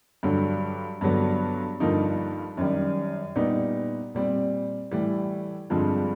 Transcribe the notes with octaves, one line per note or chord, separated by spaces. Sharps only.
G2 D3 F#3
G2 D3 F#3 B3
G2 D3 F3 A#3 D#4
F#2 D#3 G3
A#2 G3 B3 D#4
A#2 G3 C4
A2 E3 G3
G2 D3 F3 G#3 C4